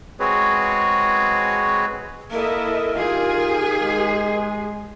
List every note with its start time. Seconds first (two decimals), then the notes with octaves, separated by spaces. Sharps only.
0.20 G#3 C4 F#4 G#4 B4 C#5
2.31 A#3 E4 A4 A#4 D#5 E5
2.97 D#3 F4 G4 G#4 G#5
3.81 G#3